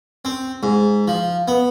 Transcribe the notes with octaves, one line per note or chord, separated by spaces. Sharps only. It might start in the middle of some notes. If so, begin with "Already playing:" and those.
C4
G#2
F3
B3